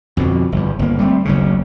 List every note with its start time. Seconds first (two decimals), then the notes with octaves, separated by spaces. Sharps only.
0.17 F2 B2 D3
0.52 G1 E2
0.79 G1 A#3
0.99 G3 A3 C4
1.25 F#1 D2 C#3